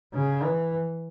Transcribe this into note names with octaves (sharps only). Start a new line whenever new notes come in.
C#3
E3